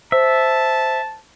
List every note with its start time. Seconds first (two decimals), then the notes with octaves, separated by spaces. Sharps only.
0.12 C5 E5 A5